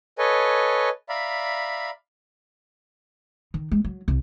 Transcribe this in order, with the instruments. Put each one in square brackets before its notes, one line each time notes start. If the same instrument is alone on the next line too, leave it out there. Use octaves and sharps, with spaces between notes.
[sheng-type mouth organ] A4 B4 C#5 D#5 G#5
D5 E5 F5 A#5 B5
[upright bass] D#3
G#3
F#3
C2